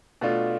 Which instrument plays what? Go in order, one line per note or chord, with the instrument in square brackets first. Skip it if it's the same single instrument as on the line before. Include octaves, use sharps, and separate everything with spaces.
[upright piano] B2 A3 D4 F4